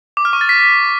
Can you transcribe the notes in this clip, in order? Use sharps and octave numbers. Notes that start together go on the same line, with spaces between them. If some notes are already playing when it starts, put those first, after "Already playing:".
D6
F6
C#6
A6
B6